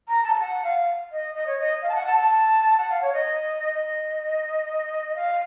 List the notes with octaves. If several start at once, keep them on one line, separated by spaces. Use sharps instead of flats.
A#5
A5
A5
F#5
F5
D#5
D#5
C#5
D#5
F5
A5
F#5
A5
A5
F#5
F5
C#5
D#5
D#5
F5